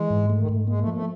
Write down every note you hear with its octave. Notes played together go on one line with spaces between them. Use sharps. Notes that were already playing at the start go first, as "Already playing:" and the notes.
Already playing: E3 G#3
G#2
A3
D#3
G#2
G#3 A#3
A3
F3
A3